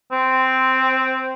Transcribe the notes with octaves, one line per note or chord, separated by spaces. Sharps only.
C4